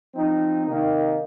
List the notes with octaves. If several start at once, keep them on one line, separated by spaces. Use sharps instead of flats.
F3 C4 D#4
C3 D#3 A#3 D#4